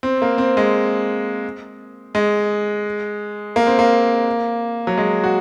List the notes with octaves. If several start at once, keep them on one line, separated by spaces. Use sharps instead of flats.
C4
A#3
C4
G#3
G#3
A#3
C4
A#3
F#3
G#3
F#4